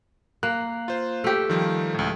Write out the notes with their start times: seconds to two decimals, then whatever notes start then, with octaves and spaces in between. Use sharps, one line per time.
0.43 A#3 F#6
0.88 F4 C5
1.24 A3 G4
1.50 D#3 F3 G3
1.94 C#2 A2